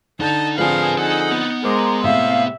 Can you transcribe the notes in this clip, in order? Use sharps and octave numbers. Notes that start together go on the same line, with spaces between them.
D3 D#4 A5 G6
D3 F3 C4 G#4 B4 F5 A5
D#4 A4 F#5
B3
G#3 A#4 C5 A#5 C6 D6
A2 C3 C4 E5 F5